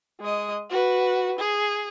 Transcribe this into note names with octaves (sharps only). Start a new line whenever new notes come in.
G#3 D#5
F#4 B4
G#4